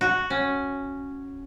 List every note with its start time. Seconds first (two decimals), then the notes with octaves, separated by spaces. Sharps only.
0.01 F#4
0.30 C#4